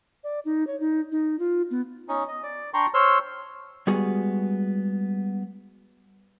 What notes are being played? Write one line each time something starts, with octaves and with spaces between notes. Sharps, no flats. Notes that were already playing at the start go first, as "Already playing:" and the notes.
D5
D#4
C#5
D#4
D#4
F4
B3
C#4 D#4
D#5
D5
D4 G5 A#5 C6 C#6
C5 C#5 C6 E6 F6
G3 G#3 B3 F#4 G#4